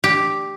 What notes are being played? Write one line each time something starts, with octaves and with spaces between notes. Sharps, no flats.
G4